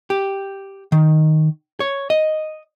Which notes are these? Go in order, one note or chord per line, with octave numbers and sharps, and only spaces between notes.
G4
D#3
C#5
D#5